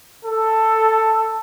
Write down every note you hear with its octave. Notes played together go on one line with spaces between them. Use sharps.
A4